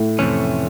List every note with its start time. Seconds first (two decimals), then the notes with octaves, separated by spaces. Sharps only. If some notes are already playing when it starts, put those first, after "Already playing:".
Already playing: A2
0.19 F2 C3 E3 A3 C#4